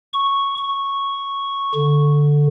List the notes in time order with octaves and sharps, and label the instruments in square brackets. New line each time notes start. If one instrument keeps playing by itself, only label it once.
[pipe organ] C#6
C#6
D3